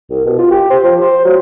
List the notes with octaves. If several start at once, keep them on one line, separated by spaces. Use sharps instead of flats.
C2
B2
F4
G4
C5
F3
C5
F#3